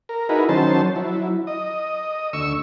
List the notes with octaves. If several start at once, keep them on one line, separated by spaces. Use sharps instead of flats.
A#4
D#4 E4 F#4 G#4 A#4 B4
D#3 F#3 C#4 C5 A5
F#3 E4
D#5
D2 C#6 E6